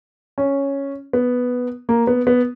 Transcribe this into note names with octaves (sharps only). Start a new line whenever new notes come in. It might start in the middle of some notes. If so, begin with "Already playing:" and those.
C#4
B3
A#3
B3
B3